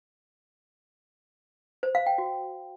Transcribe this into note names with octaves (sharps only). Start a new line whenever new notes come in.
C5
F5
G5
F#4